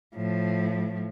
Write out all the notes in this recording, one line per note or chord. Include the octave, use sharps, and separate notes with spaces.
A2 F3